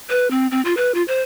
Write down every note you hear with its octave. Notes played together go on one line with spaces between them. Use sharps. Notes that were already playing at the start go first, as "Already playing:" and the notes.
B4
C4
C4
F4
B4
F4
C5